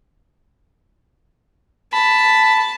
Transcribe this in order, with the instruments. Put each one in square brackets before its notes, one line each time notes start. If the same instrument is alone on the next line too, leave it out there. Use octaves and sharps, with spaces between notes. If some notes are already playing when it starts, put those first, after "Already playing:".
[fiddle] A5 [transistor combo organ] B5